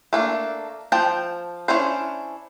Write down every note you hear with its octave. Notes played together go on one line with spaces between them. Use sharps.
A3 A#3 D4
F3 C5 G5 A5
C#4 D4 E4 C5